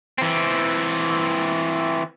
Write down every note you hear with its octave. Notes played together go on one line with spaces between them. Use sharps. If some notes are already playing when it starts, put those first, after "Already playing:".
E3 C4